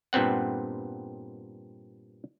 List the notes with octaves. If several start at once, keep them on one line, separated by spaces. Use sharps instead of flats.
G2 A#2 B3 C4 F#5